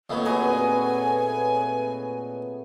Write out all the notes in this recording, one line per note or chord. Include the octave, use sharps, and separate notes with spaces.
F2 A#2 D#3 A3 B3 C#5
F#3 B3 C4 F#4 G#4 B4 G#5